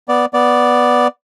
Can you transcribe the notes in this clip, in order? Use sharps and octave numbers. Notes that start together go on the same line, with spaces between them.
B3 D5
B3 D5